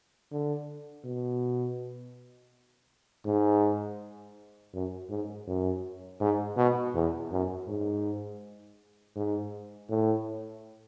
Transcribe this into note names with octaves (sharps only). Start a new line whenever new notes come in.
D3
B2
G#2
F#2
G#2
F#2
G#2
B2
E2
F#2
G#2
G#2
A2